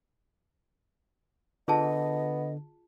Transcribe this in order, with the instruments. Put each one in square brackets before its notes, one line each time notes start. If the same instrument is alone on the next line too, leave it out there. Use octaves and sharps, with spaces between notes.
[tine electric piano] D3 [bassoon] B3 [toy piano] F4 G#4 A5 [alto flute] D#5